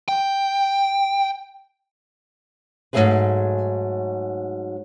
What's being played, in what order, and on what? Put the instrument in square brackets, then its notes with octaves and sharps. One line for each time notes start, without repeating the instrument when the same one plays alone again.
[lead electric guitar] G5
[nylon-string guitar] G#2 F3 F#3 A3 G#4 B4